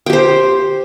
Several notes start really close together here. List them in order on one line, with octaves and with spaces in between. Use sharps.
G5 G4 C5